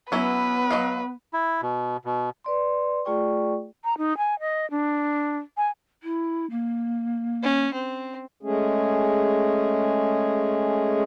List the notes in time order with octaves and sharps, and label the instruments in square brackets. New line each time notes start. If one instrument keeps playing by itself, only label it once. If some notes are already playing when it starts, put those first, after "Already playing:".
[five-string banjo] F#3 C#4 E4 [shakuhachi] B3 [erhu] B4
[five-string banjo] F#3 D#5 F5
[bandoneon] E4
B2
B2
[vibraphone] B4 D5 C6
A3 F4 G#4 D5 G5 C#6
[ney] A#5
D#4
G#5
D#5
D4
G#5
[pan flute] E4
A#3
[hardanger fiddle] C#4
C4
[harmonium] G#3 A3 C#4 G#4